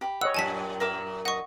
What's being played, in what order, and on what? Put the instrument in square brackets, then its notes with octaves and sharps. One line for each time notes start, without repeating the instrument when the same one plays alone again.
[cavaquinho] G4 B5
[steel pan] C#5 D#5 F#5 [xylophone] E6
[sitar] F#2 A#2 [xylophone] G#5 A5 B6
[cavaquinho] A#4 E5 D6
[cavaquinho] D#5 [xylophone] F#5 C#6